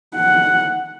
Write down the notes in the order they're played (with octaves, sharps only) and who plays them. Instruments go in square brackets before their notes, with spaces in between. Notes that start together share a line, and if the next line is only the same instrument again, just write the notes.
[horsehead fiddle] F#5